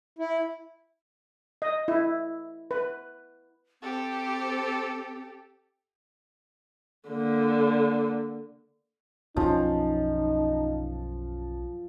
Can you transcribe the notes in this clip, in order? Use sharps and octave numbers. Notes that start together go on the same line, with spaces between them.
E4
D#5
E4
B4
C4 G4 A4
D3 A#3
B1 F#2 F3 C#4 D#4